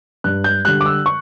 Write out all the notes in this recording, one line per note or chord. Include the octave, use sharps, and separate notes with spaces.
G2 F#6
G6
D3 G3 F#6
D6
E6
C#6